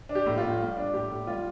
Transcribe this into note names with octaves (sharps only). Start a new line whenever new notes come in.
D4
G4
A2
F4
A2
G3
D4
A2 G4
A2
G3 F4